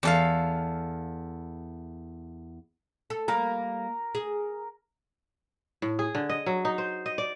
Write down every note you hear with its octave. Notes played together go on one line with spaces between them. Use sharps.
E2 A4 F5
A4
G3 A#3 A#4
G#4
A2
G#4
D3
D#5
F#3
D#4
C5
D#5
D5